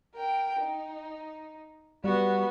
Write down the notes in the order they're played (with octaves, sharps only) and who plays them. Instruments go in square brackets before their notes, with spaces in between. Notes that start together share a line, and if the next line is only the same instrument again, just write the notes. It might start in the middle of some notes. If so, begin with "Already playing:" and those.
[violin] A#4 G5
D#4
[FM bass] G3 [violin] B3 F#4